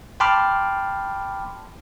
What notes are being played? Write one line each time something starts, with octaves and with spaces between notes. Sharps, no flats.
G5 A5 B5 C6 D6 F6